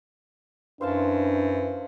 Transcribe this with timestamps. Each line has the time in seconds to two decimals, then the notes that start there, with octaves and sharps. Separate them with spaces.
0.81 F#2 E3 D4 C5 F5 A5